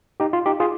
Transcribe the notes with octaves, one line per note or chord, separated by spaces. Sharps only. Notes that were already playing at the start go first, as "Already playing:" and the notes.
D#4 G4
F4
D#4 G4
F4 G#4